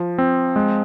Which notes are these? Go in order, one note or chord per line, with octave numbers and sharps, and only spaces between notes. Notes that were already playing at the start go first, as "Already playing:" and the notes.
Already playing: F3
C4
G#3